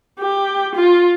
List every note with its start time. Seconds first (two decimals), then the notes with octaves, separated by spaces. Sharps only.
0.20 G4
0.75 F4